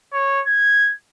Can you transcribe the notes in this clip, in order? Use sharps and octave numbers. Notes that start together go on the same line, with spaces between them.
C#5
G#6